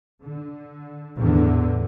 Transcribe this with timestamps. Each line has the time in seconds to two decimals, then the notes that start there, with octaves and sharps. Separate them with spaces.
0.22 D3
1.17 E2 A2 D3